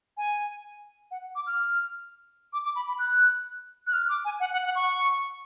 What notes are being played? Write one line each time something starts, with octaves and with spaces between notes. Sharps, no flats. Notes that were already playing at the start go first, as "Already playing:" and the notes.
G#5
F#5
D6
F6
D6
D6
B5
B5
F#6
F#6
F6
D6
G#5
F#5
F#5
F#5
C#6